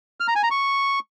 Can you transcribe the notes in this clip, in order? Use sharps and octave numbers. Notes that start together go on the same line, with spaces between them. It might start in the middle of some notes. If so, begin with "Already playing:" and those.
F6
A#5
G#5
A#5
C#6